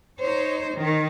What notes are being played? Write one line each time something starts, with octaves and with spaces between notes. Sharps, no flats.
D#4 C5 C#5
D#3